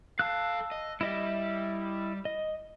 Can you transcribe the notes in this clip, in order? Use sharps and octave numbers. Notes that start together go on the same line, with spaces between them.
A4 F5 A5 E6 F#6
D#5
G3 E4 D#5 E5
D#5